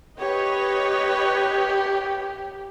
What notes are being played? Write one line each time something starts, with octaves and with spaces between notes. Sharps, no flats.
G4 B4 C#5 D#5